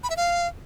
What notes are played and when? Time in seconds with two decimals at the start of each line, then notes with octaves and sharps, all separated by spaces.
0.03 B5
0.10 E5
0.16 F5